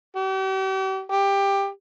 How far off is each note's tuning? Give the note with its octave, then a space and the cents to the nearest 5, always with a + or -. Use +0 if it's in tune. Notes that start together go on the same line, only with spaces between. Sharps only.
G4 -40
G4 +15